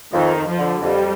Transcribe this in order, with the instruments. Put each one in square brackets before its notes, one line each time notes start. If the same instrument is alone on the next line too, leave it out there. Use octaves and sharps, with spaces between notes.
[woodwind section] F2 [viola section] D#3
[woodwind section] F2
[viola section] F3
[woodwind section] D3
[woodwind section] F2 [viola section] G3